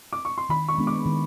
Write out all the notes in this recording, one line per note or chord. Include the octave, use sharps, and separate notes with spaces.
D6
C#6
C6
D#3 B5
C#6
G#3 B3 D4
D6
D#3